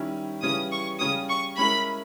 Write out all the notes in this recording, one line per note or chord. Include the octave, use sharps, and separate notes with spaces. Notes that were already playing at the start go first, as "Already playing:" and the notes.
Already playing: D#3 G3 C#4 E4
C#3 E3 G3 C#4 D#6
C#6
C#3 G3 C#4 D#6
C#6
G#3 C#4 E4 A#4 B5